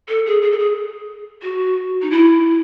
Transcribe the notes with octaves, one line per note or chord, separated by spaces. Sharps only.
A4
G#4
G#4
A4
G#4
F#4
D#4
E4